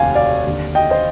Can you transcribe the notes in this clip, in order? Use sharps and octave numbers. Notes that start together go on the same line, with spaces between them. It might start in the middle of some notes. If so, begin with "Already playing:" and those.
Already playing: F1 D#2 F5 G#5
D5 F5
D#2 D3
D#5 G5
C5 D#5